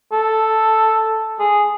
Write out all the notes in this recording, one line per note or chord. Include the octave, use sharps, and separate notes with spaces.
A4
G#4